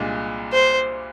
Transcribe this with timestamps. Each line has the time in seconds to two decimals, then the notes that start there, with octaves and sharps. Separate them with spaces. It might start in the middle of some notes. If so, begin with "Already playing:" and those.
Already playing: C2 A#2 G#3 D4
0.53 C5